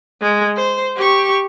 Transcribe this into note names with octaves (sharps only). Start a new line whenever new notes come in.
G#3
C5
G4 C#6